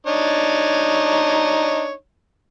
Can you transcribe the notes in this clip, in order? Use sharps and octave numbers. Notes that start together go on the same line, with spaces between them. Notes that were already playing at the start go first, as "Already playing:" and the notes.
D4 D#4 C#5